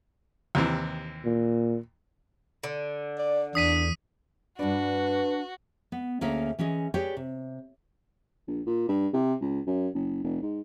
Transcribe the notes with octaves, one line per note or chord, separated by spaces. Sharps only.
D#2 C3 E3
A#2
D3
D5
E2 D4 D#6 B6 D#7
G2 D4 F#4 B4 D5
B3
D2 A#3 C#4 G#4 E5 F5
E3 C#4 G#4 D#5
G4 G#4 B4 C#5 D5 G5
C3
A#1
A#2
G2
C3
C#2
F#2
F#1
F1
G#2